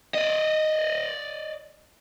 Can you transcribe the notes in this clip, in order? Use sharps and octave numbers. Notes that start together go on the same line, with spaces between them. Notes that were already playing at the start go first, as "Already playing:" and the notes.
D5 D#5